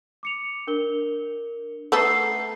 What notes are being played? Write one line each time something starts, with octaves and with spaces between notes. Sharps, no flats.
D6 C#7 F7
D4 A#4 G7
A3 B3 A4 A#5 C7